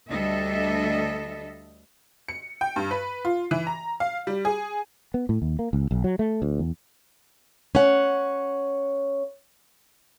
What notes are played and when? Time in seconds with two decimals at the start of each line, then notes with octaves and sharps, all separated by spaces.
0.10 D2 G3 D4 A4 D#5 E5
2.28 C#7
2.61 G5
2.76 G2
2.91 B4
3.25 F4
3.51 E3
3.67 A#5
4.00 F5
4.27 G3
4.45 G#4
5.14 B3
5.29 A2
5.42 D#2
5.59 A#3
5.73 C#2
5.91 B1
6.04 F#3
6.19 A3
6.42 D2
6.59 E2
7.75 C#4 F#5